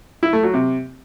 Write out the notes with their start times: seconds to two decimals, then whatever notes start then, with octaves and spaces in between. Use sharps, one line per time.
0.23 E4
0.33 A3
0.43 F#3
0.54 C3